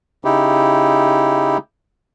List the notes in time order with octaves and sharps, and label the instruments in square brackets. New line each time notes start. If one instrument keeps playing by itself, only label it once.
[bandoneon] C#3 D#4 E4 G4